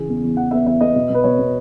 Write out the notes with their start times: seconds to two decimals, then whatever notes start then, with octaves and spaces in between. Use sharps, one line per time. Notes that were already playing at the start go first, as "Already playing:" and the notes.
Already playing: C#3 E3 G#4
0.09 E2
0.23 E2
0.37 E3 F#5
0.51 B3 E5
0.66 E2 E5
0.81 B3 D#5
0.96 B2
1.10 B2 B4
1.24 B2 C#5
1.39 B2